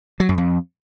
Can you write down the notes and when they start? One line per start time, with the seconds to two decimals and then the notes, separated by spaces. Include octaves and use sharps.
0.20 F#3
0.29 F#2
0.38 F2